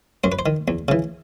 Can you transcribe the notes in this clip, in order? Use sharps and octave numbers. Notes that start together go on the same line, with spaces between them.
F#2 C5
B4
C5
D#3
E2
C#3 E3